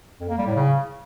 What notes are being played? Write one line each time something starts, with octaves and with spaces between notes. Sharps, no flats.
F2
A#3
G3
A2
C#3